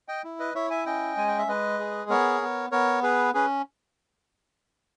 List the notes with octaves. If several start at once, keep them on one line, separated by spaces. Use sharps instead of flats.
D#5 G5
E4
B4 D#5
E4 C#5 E5
E5 G#5
C#4 D#5 G5
G#3 G#5
G5
E5
G#3 B4 D#5
G#4
B3 A#4 C#5
B3
B3 A#4 C#5
G#4 B4
C#4 G#4 B4